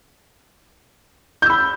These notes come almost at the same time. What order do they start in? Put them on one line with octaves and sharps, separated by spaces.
G6 E6 B5